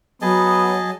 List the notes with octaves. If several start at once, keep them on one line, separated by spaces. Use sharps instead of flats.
F#3 B3 G#4 D#5 A5